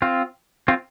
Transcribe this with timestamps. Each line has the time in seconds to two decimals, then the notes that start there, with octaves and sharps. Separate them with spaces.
0.02 C4 F4
0.68 C4 F4